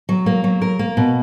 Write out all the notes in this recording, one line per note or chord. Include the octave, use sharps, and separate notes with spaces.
F#3
A#3
F#3
A#4
A#3
B2